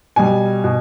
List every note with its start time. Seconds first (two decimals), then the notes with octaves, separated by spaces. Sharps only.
0.16 B2 G3 G#5
0.64 B2